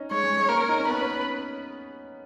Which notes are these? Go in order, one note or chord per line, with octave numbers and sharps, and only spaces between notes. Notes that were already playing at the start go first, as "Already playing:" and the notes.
Already playing: C#4 D#4
G#3 C#5
G#3
G#3
A#3 A#4
C#4
D#4
C#4
B3 B4
C#4